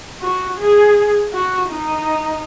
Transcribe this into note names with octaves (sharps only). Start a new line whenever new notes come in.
F#4
G#4
F#4
D#4